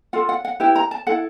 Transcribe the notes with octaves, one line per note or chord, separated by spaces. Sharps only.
F4 A4 F#5
F#5
F#5
E4 G4 B4 G5
A#5
A5
E4 A4 F#5